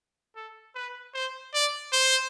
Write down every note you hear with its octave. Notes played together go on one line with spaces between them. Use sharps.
A4
B4
C5
D5
C5